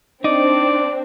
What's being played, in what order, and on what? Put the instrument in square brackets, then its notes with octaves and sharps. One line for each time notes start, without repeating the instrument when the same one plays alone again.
[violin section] C4 [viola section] D4 [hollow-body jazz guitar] D#4 [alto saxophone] D5